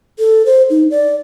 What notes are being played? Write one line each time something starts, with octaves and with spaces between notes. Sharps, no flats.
A4
C5
D#4
D5